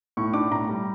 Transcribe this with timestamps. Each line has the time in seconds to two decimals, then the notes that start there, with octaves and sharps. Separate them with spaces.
0.17 A2 C#6
0.34 D4 D6
0.51 A2 A#5
0.69 G3